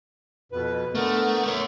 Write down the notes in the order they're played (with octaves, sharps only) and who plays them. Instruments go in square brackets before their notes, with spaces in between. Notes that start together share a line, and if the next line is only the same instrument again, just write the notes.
[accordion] F2 B2 B4
[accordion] D3 B3 A#4 [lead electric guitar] A3
[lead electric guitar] A#4 C#5 [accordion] E5